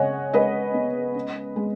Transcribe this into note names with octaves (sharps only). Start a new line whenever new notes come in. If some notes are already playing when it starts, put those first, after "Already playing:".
Already playing: C#3 G#3 C#5 D#5 F#5 G#5
G#3 B4 D#5
B3
C#4
G#3